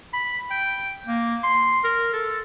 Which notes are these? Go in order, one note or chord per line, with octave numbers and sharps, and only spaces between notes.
B5
G5
A#3
C6
A#4
A4